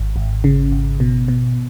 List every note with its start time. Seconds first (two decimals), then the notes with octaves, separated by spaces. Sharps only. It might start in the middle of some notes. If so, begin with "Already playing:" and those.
Already playing: G#1
0.16 G#1
0.44 C#3
0.72 G#1
1.00 B2
1.28 B2